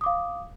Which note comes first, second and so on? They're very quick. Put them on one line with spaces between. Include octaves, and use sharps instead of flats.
D#6 D6 F5